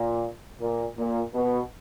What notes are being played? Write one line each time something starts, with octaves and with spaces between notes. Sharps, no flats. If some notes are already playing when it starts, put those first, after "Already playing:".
Already playing: A#2
A#2
A#2
B2